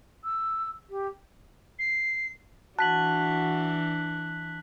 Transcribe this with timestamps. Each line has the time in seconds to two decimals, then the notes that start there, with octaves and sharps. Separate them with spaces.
0.24 E6
0.90 G4
1.79 C7
2.79 E3 D4 F#4 A5 F#6 B6 F#7